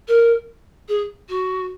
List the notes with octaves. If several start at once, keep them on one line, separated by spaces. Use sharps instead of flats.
A#4
G#4
F#4